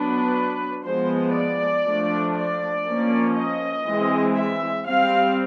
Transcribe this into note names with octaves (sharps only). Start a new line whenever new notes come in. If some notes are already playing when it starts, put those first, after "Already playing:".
Already playing: F#3 B3 D4 B4
F3 G#3 B3 C5
D5
F3 A3 D4
D5
F3 A#3 C#4
D#5
E3 G#3 C4
E5
G3 C4 F5